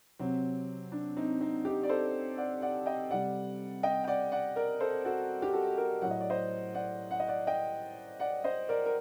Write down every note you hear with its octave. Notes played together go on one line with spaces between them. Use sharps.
C3 F#3 C4
D4
C4 D#4
C4 D#4
D#4 G4
D5
A4 C5
D5 F#5
D5 F#5
D#5 G5
C3 G3 D5 F#5
D#5 G5
G5
D5 F#5
D5 F#5
A#4 D5
A4 C5
F#4 A4
G4
F#4 A4
G4 A#4
A2 F#3 F#5
D#5
D5
C5 D#5
D5 F#5
F#5
D#5
D5 F#5
D#5 G5
D5 F#5
C5 D#5
A#4 D5
A#4